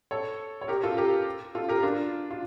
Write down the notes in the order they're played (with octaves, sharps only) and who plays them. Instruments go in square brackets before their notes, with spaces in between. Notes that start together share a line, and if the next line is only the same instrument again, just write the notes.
[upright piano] A4 C#5
C#5
G4 A#4
F4 A4
G4 A#4
F4 A4
G4 A#4
D4 F4
F4